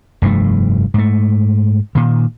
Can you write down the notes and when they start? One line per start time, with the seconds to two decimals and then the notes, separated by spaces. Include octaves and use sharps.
0.22 F1 G2 F3 A3
0.94 G#2 A3
1.95 A#2 D#3